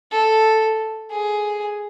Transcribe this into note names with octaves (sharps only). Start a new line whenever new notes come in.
A4
G#4